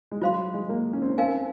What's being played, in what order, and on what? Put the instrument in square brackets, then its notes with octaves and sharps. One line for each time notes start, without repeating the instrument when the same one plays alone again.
[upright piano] G#3
[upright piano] F#3 [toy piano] F4 C5 F5 C6
[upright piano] G#3
A#3
C#4
C4
C#4
[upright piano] C4 [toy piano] D#4 A#4 F5 G#5